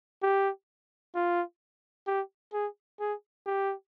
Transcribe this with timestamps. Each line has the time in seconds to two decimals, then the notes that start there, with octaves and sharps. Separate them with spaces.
0.22 G4
1.15 F4
2.07 G4
2.53 G#4
3.00 G#4
3.46 G4